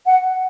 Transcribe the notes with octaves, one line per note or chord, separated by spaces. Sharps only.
F#5